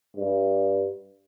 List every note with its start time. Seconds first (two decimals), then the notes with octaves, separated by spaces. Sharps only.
0.17 G2